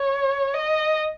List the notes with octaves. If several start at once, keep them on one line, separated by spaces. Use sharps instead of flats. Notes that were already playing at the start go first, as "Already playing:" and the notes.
Already playing: C#5
D#5